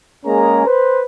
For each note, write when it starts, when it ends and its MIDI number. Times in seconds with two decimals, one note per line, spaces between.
0.25 0.65 56
0.25 0.65 58
0.25 0.65 61
0.25 0.65 68
0.25 0.65 70
0.25 0.65 82
0.66 1.02 71
0.66 1.02 72